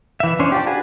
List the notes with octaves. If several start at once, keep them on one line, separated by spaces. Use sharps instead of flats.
E3 E5
C#4 D4 C5 C#5
D4 F4 G4
D4 F#4 G#4 B4